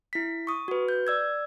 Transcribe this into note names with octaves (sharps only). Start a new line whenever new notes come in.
E4 B6
C#6 D#6
F#4 B4
G6
D5 E6 G#6